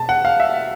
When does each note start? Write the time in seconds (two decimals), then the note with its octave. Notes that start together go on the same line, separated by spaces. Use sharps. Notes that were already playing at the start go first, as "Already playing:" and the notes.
Already playing: B2 A5
0.09 F#5
0.25 F5
0.40 E5